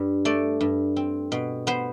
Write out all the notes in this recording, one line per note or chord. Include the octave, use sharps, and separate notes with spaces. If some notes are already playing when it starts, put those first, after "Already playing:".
Already playing: G2
A3 D5
G2
C4
B2
B3 C5